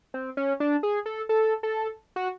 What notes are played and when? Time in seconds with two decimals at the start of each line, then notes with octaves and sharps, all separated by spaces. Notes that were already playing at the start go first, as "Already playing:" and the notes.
0.14 C4
0.37 C#4
0.60 D4
0.83 G#4
1.06 A4
1.29 A4
1.63 A4
2.16 F#4